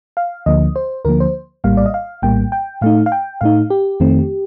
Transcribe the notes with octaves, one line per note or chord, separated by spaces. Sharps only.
F5
D2 D3 F3 A#3 D#5
C5
D2 D3 F3 A#3 A#4
C5
A#1 A2 G3 A#3 F5
D5
D#5
F5
A#1 A2 G3 A#3 G5
G5
A2 A3 D#4 F5
F5
G5
A2 A3 D#4 F5
G4
F2 D#3 A3 C4